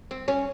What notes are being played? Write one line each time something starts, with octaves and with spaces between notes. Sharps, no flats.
C4
C#4